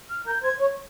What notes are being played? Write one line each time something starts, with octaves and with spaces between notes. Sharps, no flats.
F6
A#4 G6
C5 G#6
C#5